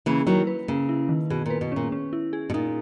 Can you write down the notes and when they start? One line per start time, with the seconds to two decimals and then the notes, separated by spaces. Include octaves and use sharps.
0.06 C#3 E3 A#3
0.26 D#3 F#3 E4
0.47 B4
0.68 C#3 A#3
0.89 E4
1.09 D#3
1.30 B2 G#4
1.46 A#2 B4
1.61 B2
1.72 A#2 C#4
1.92 C#4
2.13 E4
2.33 G#4
2.50 B2
2.54 A#2 D#4